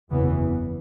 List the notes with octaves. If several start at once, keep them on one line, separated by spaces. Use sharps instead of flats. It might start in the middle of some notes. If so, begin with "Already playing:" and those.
F#1 E2 C#3 E3 B3